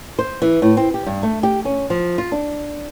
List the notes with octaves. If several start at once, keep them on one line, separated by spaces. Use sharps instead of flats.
C5
E3
A2
C4
G4
G2
A3
G4
C#4
F3
F4
D4